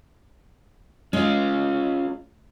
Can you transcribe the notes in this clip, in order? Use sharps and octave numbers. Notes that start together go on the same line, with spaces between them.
G#3 C#4 F4